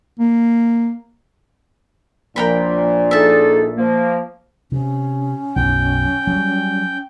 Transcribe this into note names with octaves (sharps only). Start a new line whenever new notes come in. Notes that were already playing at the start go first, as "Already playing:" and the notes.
A#3
A#1 A#2 A#4 G5 B5
D#4 G#4 A4 E5 A5
F3 A#3
C3 C#4
B1 F#2 B2 G5
F#3 G3